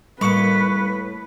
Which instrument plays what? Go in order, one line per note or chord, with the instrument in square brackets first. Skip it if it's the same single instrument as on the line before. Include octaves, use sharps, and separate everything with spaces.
[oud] A2 A#3 [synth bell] G3 C#6 C#7 [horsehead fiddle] B4